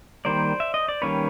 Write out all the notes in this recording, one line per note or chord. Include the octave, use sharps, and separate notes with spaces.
D#3 G3 A#3 C5 D5
E5
D#5
D5
D#3 G3 A#3 C#4 B4 C#5